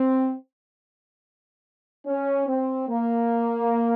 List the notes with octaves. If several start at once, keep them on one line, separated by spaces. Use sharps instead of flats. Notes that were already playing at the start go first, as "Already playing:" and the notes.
Already playing: C4
C#4
C4
A#3